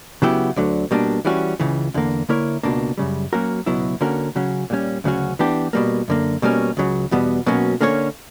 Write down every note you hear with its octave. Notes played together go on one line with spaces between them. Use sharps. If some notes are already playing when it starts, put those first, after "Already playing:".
C#3 F#3 B3 E4 G4
D2 D3 F#3
B2 G3 A#3 D4
E3 G3 C#4 F#4
C#2 C#3 E3
E2 D3 A#3
D3 A#3 E4 A#4 C#5
C#2 B2 A#3 D4
F#2 C#3 G3
F#3 A#3 C#4 F#4 A#4
C#2 B2 F#3 B3 E4
D3 A#3 C#4 F#4 A#4
C#3 F#3 C#4
A#2 G3 C#4
D2 C#3 F#3 C#4 F#4
E3 B3 D4 G4
B2 G3 A#3
F#2 D3 A#3
B2 G3 A#3 C#4
C#2 C#3 F#3
E2 B2 G3 B3
B2 F#3 A#3 C#4
D3 A#3 C#4 G4 C#5